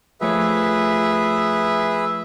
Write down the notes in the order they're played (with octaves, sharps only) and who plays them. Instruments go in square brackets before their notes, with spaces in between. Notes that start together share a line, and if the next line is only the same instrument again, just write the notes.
[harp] F3 A3 C#5 [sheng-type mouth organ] G#4 B4 E5